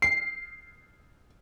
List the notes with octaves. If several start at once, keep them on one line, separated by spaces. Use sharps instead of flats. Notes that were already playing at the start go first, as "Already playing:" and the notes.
C7